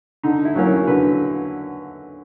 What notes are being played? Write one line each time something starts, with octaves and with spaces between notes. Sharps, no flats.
D3 D#4
E4
F#3 A#3 C#4
F#4
D3 B4